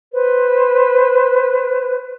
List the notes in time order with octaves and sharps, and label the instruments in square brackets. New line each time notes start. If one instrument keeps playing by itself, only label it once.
[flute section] B4 C5